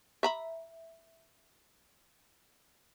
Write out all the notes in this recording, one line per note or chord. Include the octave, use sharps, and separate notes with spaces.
E5 A#5 B5